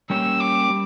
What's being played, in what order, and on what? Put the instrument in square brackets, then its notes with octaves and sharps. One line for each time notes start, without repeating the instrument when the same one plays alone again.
[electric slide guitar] G3 A#3 C#4 G4 C#5 [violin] E6
[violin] D6
[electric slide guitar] G3